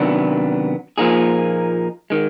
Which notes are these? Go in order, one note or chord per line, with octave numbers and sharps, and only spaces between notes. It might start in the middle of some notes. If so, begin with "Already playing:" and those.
Already playing: C3 D#3 F#3 B3 D4
A#2 F3 A#3 D#4 G#4
D#3 G#3